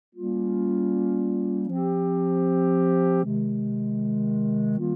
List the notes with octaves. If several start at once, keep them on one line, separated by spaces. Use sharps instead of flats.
G3 A#3 C#4 F4
F3 C4 G4
C3 D#3 G#3
D#3 G3 A#3 F4